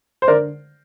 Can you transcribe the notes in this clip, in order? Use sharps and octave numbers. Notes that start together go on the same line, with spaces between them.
C5
D3 A#4 D5